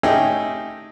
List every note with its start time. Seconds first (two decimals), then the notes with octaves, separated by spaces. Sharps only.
0.03 A3 C#4 D#4 E4 G4 G#4